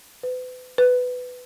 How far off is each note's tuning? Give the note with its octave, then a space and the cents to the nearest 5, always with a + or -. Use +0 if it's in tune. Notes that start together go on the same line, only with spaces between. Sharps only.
B4 +35
B4 +10